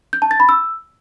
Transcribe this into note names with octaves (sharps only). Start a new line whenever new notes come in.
G6
A5
A6
B5
E6